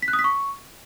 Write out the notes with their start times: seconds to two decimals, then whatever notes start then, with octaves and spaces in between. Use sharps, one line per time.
0.02 B6
0.08 F#6
0.13 D#6
0.19 B6
0.24 C#6